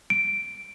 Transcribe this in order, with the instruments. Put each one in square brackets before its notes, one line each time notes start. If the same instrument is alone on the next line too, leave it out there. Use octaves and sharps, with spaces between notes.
[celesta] D7